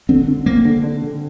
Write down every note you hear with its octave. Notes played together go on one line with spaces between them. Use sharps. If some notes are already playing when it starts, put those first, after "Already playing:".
D3 C4
D3
A#3 C4
D3
D3
D3